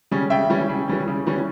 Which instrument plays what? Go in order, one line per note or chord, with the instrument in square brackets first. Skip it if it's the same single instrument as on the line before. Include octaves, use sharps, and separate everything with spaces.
[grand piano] C#3 G3 C#4
C#3 E5 G5
E3 G3 C#4
C#3
E3 G3 C#4
C#3
E3 G3 C#4